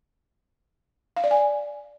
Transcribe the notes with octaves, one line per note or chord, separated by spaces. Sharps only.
F5
D5
G#5